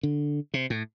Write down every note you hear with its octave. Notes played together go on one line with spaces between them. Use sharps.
D3
C3
A2